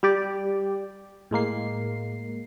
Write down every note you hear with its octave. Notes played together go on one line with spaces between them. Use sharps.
G3 G4 D5
A2 G#3 A#3 C7